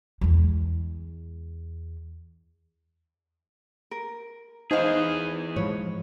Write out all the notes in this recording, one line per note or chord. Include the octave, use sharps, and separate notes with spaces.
E2 G#3
A#4
E3 D#4 G#4 C5 F5
G#2 F3 C#5